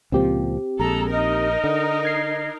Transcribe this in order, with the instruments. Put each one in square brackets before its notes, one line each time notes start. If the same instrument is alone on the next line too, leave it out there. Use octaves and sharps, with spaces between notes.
[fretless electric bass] C#2 A#2 F3 [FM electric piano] C4 G4
[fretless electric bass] A#1 [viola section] G#3 A4 [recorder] A#5
[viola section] D#4 A#4 [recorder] D#5
[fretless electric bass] D3
[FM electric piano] G#6 C7